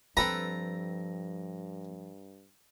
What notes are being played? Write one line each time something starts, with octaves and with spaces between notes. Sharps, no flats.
G2 F3 C4 A4 B4 A#5